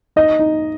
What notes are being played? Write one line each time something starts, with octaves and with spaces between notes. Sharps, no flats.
D#4 D#5
D#4